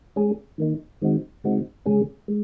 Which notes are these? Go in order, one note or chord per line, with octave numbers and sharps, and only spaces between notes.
G#3 C#4 G#4
D#3 A#3 D#4
D#3 G#3 C4 D#4 F#4
C#3 G#3 C4 D#4 F#4
C#3 G#3 C#4 G#4
G#3